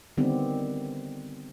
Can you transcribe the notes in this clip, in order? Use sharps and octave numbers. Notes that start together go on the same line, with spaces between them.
D3 D#3 G3 B3 C4 G4